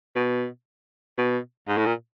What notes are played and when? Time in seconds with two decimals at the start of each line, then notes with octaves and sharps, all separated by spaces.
0.16 B2
1.18 B2
1.68 G#2
1.77 A2
1.86 A#2